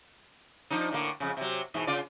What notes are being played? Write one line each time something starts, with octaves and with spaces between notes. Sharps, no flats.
F3 D4 D#4
A2 D3 A#3
F2 C#3
C3 F#3
G#2 B2 E3
C#3 F4 D5